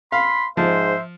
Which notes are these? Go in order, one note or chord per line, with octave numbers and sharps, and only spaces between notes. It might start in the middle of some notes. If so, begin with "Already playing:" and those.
F5 B5 C6
G#2 F3 C5 E5